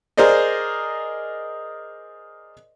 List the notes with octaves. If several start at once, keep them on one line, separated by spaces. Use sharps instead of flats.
G#4 A#4 C5 D5 D#5